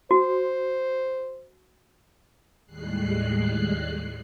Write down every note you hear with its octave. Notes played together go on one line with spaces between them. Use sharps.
F#4 C5
D#2 A2 G3 G#3 F#6 C7